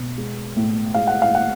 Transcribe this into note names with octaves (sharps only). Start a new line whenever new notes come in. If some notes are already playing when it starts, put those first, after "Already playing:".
Already playing: B2
G#3
A2
G#3 F5
F#5
F5
F#5